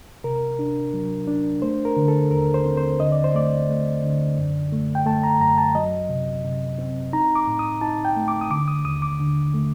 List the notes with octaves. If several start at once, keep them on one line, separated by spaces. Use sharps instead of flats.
C3 A#4
D4
F#3
D4
A3 C5
A#4
D3
A4
D#2 A#4
C5
C4
C5
D3 D#5
D5
C5
A3 D5
A3
D3
F#2
A3
G5
A3 A5
A#5
F#2 A#5
A5
F#3 D#5
C3
C3
C4
D#4 A#5
D6
A2
D#6
D#4 A5
G5
A3
D6
D#6
D3 D6
D#6
D#2 D#6
D6
D3
A3